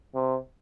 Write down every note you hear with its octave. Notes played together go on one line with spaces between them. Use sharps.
C3